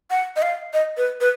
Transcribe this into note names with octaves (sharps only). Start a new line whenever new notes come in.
F#5
D#5
F5
D#5
B4
B4